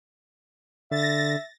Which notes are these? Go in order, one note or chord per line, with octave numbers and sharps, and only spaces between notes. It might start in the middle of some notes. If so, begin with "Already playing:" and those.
D3 E5 A6 A#6